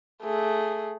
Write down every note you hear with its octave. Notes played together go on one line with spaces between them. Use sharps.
A3 G#4